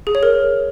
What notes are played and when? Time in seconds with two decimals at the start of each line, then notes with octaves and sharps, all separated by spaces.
0.07 G#4
0.15 C#5
0.23 A#4